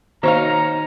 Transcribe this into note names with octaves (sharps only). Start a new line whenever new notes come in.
D#3 A#3 D#4 F#4 C5 C#5 F5 A#5